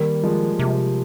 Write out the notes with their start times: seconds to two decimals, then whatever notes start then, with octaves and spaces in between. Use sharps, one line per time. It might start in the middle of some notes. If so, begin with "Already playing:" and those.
Already playing: D#3 G3 A#3
0.23 F3 G#3
0.59 C3 F3